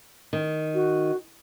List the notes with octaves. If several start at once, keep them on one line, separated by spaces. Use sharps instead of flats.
D#3
F#4